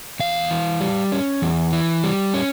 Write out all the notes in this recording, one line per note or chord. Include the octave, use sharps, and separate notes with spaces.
E2 F5
E3
G3
C#4
E2
E3
G3
C#4